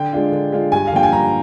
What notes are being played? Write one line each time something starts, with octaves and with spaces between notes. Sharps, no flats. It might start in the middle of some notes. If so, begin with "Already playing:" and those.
Already playing: D3 G5
G#3 D4 F4
D3
G#3 D4 F4
G2 G#5
F5
D3 F3 A#3 G5
G#5
G2 A#5